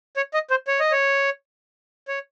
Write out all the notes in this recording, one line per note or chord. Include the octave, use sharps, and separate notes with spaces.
C#5
D#5
C5
C#5
D#5
C#5
C#5